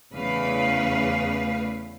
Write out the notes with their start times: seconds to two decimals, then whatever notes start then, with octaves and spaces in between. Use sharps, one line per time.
0.13 E2 C#3 A3 B4 F5